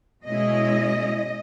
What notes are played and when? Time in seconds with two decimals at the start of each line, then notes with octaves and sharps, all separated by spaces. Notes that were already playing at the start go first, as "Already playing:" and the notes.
0.24 B2 G#3 C#4 E4 D#5